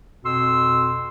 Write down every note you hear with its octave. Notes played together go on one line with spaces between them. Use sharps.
F2 B2 C6 E6